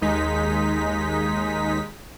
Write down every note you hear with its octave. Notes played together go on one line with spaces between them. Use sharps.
D#2 G#3 D#4 B6